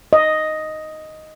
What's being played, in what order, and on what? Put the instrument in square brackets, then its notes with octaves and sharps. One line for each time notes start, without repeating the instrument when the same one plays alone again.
[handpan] D#5